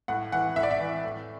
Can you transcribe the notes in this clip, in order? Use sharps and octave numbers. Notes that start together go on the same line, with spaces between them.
A2 F#5
E3 F#5
A2 E5
D5
E5
E3
A2